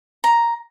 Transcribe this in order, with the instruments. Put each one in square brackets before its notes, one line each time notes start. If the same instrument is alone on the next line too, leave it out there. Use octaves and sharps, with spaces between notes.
[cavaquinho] A#5